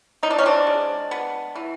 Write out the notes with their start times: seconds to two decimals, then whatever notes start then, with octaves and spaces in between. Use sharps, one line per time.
0.23 E3 D#4
0.30 D4
0.38 C#4
0.45 C4 D4
0.67 G#3
1.11 B3
1.55 E3